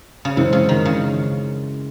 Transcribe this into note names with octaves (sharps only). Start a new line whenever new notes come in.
C#3
F#2 C3 E3 G#3 C#4 E4
C#3
D#3
C#3